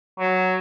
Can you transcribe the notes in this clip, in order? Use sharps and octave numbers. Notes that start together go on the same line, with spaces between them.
F#3